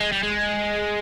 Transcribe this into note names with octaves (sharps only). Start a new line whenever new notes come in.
G#3
G3
G#3